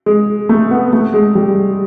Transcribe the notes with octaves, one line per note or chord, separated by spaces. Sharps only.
G#3
A3
B3
A3
G#3
G3